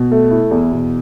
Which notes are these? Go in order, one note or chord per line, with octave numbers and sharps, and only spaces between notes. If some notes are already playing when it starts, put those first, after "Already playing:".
Already playing: B2
A3
E4
E2
B2